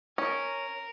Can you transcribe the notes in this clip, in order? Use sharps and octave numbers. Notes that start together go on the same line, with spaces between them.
C#4 A#4